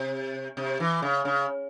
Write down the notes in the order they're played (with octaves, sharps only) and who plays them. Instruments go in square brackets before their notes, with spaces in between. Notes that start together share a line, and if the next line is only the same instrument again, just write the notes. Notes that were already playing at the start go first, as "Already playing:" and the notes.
Already playing: [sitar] C3
C3
E3
C#3
C#3